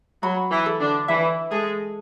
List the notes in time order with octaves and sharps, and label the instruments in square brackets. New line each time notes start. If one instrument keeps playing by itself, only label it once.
[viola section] F#3 F#4 [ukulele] B5
[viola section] E3 E4
[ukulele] A4
[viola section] D3 D4
[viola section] E3 E4 [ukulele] E5
[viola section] G#3 G#4 [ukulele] A4